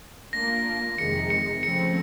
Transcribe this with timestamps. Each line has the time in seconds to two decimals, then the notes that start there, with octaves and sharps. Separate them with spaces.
0.33 A#3 D4 F4 A#6
0.98 F2 C3 D#3 G#3 C#7
1.30 C#7
1.63 C#3 F3 A3 C4 C#7